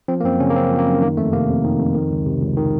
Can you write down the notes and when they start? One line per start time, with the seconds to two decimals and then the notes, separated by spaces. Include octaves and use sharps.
0.08 F3 C4
0.20 A#3
0.24 F#2 C4
0.40 C#3 C#4
0.50 A#3
0.55 F#2 C4
0.71 F3
0.79 A#3
0.87 F#2
1.02 D#3 A#3
1.17 F2 A3
1.33 C3 A#3
1.49 F2
1.65 D#3
1.79 F2
1.95 D#3
2.11 C#2
2.26 C3
2.42 C#2
2.57 D#3